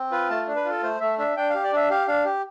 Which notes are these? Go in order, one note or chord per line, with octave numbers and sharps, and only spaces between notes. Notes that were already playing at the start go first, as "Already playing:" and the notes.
Already playing: C4
F4 B4
A3 A5
D4
B4
F4 A4
A3 C5
A3 E5
D4 E5
D4 G5
G4 F5
D5
D4 E5
G4 F5
D4 F5
G4